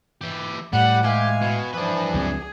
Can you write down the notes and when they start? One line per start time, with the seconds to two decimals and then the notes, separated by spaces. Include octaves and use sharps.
0.21 E3 G4
0.73 A2 G3 F#5
1.05 E3 G#3 G4 F5 G#5
1.42 B2
1.73 E3 F3 D4 B4
2.14 C#2 F#3 C4 G#4